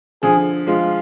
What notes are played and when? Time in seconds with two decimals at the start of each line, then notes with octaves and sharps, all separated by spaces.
0.23 D3 F3 G#4
0.67 F3 G#3 F4